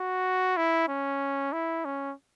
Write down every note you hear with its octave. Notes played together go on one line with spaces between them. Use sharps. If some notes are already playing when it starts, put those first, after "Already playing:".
Already playing: F#4
E4
C#4
E4
C#4